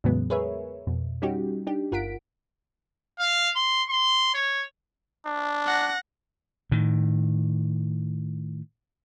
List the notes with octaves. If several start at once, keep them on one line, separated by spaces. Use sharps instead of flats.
E2 A2 C#3 F#3 G#3 B3
G#4 A#4 B4 C#5 E5
F2 B2
G3 C#4 D#4 F#4 G4
D4 D#4 G4
G1 F4 A#4 F#5 B6 D7
F5
C6
C6
C#5
D4
F#5 A#6
A2 D#3